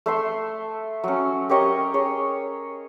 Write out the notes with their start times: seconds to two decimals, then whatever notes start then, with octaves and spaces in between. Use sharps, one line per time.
0.06 A3 E5 C6
1.04 F#3 C#4
1.49 G4 A#4 C#5 D#5
1.94 G#4 C#5